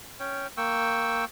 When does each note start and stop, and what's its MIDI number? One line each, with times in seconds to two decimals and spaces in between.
0.20 0.47 61
0.20 0.47 73
0.20 0.47 79
0.57 1.25 58
0.57 1.25 79
0.57 1.25 85
0.57 1.25 88